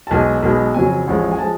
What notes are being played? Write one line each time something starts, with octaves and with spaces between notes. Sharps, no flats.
A5
B1 B2 G#3 G#5
B1 B2 G#3
F2 C#3 F#3 G#5
A1 A2 F3 G#3
G#5
F3 G#3 A5